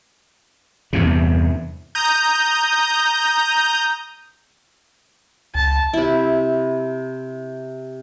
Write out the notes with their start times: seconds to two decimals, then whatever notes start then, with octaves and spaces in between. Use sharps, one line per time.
0.93 E2 G2 C3
1.95 A#5 D#6 G6
5.55 C#2 A5
5.94 C3 E4